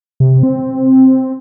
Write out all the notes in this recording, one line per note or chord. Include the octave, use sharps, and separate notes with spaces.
C3
C4